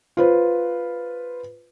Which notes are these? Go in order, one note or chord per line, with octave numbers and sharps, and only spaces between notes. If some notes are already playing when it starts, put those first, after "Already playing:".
F4 B4 C5